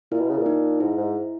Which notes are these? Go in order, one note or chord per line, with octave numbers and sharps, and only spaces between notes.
A#2 E4
B2
C#3
A#2
D#4
G#2 E4
G#2